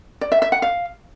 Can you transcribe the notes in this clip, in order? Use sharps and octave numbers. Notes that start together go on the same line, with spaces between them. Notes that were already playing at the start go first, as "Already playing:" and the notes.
D5
E5
E5
F#5
F5